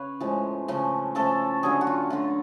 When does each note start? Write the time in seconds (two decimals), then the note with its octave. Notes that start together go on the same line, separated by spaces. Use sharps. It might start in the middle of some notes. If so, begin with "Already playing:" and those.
Already playing: C#3 B4 C#5 F5
0.20 A2 F3 G#3
0.68 C#3 F3 A3
1.15 C#3 F3 A3 A4
1.63 D3 F#3 A3 G#4
1.81 F#4
1.87 F4
2.10 D3 F#3 A3 F4